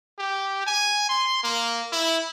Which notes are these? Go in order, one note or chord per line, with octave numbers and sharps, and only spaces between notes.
G4
G#5
C6
A#3
E4